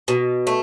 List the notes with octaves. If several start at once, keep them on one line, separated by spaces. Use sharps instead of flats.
B2
A3